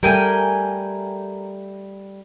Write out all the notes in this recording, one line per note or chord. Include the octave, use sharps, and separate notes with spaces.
G3 A3 A#4 G5 G#5